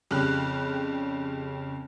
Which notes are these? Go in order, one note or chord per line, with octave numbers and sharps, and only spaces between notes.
F2 C#3 G3 B5 F6 F#6